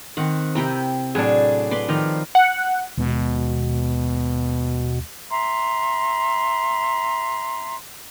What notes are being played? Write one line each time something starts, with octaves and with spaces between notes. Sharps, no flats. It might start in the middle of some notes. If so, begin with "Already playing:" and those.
D#3 C4 F#5
C3 E4 G5 A#5
A2 F#3 D4 G#4
B4 D5 C6
D#3 F3 D5 A#5
F#5
D#2 B2 G#3
E5 A#5 C6